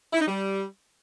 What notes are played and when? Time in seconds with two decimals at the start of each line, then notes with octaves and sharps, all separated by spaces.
0.13 E4
0.20 D#4
0.28 G3